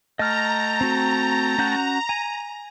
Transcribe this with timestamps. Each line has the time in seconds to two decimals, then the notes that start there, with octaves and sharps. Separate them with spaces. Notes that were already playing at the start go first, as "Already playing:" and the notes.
0.19 A3 D#5 G5 A5 A#5 F6
0.81 C4 F#4
1.59 C#4 F#4 G6
2.09 G#5